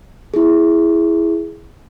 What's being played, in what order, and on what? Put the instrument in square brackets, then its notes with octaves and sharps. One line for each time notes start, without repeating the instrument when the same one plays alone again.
[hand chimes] E4 G#4